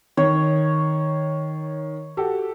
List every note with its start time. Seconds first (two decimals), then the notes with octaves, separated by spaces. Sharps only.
0.17 D#3 C#5
2.17 F#4 G4 A4